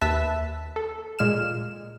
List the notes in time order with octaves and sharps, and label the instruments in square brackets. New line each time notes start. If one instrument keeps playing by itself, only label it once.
[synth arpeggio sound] D#2 B4 E5 A5 E6 B6
A4
A#2 G#3 F6 E7